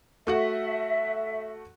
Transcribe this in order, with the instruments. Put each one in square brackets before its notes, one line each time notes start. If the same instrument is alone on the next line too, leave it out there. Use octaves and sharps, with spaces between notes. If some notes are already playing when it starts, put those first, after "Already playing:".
[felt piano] A3 F#4 F#5 [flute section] E5